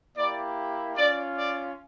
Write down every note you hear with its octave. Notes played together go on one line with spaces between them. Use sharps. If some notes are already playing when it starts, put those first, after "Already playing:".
A#3 E4 G4 D5
C#4 F4 D5
D5